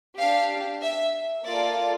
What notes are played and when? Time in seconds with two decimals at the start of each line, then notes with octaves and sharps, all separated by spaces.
0.17 D4 G4 F5
0.82 E5
1.45 A#3 F4 A4 D5